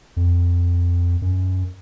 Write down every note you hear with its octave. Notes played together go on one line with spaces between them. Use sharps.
F2
F#2